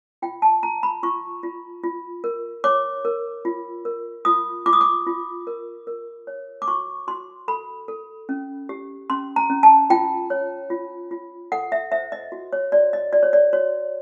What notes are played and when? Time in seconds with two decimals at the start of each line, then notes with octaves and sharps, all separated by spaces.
0.22 F4 G5
0.42 A5
0.63 F4 A#5
0.83 B5
1.03 F4 C#6
1.43 F4
1.84 F4
2.24 A#4
2.64 C#5 D6
3.05 A#4
3.45 F4
3.85 A#4
4.25 F4 D#6
4.66 F4 D6
4.73 D#6
4.81 D6
5.07 F4
5.47 A#4
5.87 A#4
6.27 C#5
6.62 D6
6.68 F#4 C#6
7.08 F#4 C6
7.48 A4 B5
7.88 A4
8.29 C#4
8.69 G4
9.10 C#4 C6
9.36 A#5
9.50 C#4
9.63 A5
9.90 F4 G5
10.30 C#5
10.70 F4
11.11 F4
11.52 A4 F#5
11.72 E5
11.92 C5 E5
12.12 D#5
12.32 F#4
12.53 C#5
12.72 F#4 D5
12.93 D#5
13.12 F#4 D5
13.23 C#5
13.33 D5
13.53 F#4 C#5